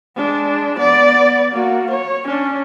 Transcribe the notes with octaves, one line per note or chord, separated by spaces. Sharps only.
G#3 D4
B3 D5
A#3 F#4
C#5
C#4 D4